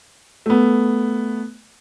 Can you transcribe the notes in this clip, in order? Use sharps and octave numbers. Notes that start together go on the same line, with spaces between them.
A3 B3